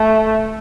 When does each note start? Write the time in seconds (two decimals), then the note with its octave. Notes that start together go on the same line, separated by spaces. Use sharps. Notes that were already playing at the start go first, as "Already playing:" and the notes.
Already playing: A3